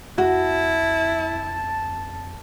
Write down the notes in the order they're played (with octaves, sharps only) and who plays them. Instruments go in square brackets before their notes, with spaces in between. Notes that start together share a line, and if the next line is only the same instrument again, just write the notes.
[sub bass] F2 [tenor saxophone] E4 [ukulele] F#4 [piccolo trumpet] A5